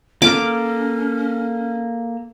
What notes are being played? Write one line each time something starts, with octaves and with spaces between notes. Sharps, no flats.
A#3 C#4 A4 D6 F6